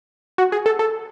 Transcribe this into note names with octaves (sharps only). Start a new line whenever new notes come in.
F#4
G#4
A4
A4